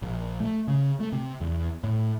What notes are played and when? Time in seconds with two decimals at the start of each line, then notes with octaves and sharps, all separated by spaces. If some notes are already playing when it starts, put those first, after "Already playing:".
0.02 A#1
0.40 A3
0.68 C#3
1.00 A3
1.13 C3
1.41 E2
1.84 A2